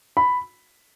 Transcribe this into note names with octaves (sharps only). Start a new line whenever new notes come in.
B5